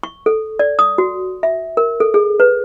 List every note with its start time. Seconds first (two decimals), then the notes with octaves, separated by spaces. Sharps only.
0.03 C#6
0.26 A4
0.59 D5
0.79 D#6
0.98 F#4
1.43 E5
1.77 A#4
2.00 A4
2.14 G#4
2.40 B4